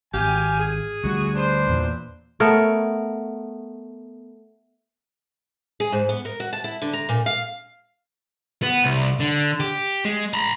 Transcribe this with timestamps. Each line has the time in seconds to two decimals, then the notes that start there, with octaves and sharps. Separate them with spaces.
0.14 G#1 G4 F5 G5 G#5
0.59 G#4
1.04 D2 G3 F#4
1.33 D4 B4 C5
1.69 E2 A#2
2.40 A3 B3 A#4 C#5
5.80 G#4
5.92 G#2
6.09 B3
6.25 A#4
6.40 F#4
6.53 A5
6.64 E4
6.82 D3
6.93 A#5
7.09 A#2
7.26 F5
8.63 B3
8.84 C2
9.20 D3
9.60 G4
10.05 G#3
10.34 A#5 B5